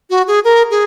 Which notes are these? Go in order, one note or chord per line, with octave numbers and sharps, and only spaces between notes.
F#4
G#4
A#4
G#4